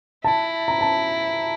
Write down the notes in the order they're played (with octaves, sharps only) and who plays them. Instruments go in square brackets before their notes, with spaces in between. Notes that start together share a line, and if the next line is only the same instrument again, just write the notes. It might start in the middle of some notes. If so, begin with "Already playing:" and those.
[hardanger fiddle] E4 [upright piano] A5
[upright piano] A#5
A5